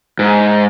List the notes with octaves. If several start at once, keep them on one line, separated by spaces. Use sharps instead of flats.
G#2